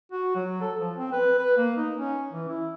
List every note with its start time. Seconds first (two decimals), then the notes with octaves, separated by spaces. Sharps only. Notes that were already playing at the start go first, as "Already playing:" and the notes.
0.12 F#4
0.35 F#3
0.61 A4
0.79 F3
0.97 C4
1.13 B4
1.38 B4
1.57 A#3
1.77 D#4
1.97 C#4
2.33 E3
2.49 E4